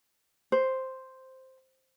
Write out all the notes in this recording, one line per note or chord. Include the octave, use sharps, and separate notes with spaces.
C5